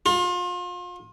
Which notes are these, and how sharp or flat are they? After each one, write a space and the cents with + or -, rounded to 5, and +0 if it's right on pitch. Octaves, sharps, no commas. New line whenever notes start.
F4 +35